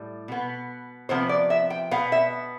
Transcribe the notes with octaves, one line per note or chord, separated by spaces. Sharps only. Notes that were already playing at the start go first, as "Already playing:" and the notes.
Already playing: A2 G3
B2 B3
C3 F3 B3 C5
D5
E5
G5
B2 B3 F5
E5